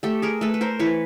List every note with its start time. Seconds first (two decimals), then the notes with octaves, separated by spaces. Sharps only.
0.03 A3 G4 A4
0.22 G#4 A#4
0.41 A3 A4 B4
0.54 B4
0.61 A#4 C5
0.79 E3 B4 C#5